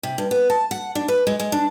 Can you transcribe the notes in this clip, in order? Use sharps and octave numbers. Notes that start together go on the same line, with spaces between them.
C3
G2
B3
A5
F#5
D4
B4
G#3
G#3
D4